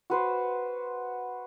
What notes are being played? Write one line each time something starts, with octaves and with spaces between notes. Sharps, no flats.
F#4 B4 C5